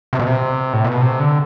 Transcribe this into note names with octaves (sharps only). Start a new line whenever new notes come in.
C3
B2
C3
A2
B2
C3
D3